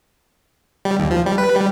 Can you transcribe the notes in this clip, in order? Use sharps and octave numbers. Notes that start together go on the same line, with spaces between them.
G3
D#2
F3
G3
B4
G3